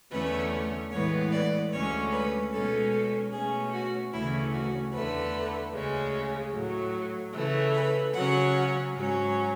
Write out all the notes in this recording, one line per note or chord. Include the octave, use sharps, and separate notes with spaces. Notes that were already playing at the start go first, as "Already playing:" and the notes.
E2 D3 A3 C#4 B4
A2 E3 G#3 B3 C#5
D5
D2 D3 G#3 C#4 C#5
B4
B2 G#3 C#4 A4
A4
B2 A3 C#4 G#4
F#4
D2 C#3 E3 A3 C#4 E4
F#4
E2 D3 A3 B4
D2 C#3 G#3 C#4
A2 F#3 A3
C#3 E3 A3
B4
C#3 F#3 C#4 F#5
G#2 F#3 C#4